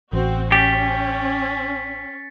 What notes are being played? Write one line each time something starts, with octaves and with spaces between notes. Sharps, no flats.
A1 C4 F#4
C#4 G4 A6 B6 C#7